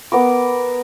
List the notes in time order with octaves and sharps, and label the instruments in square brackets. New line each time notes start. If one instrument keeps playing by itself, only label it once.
[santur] B3 A#4 D6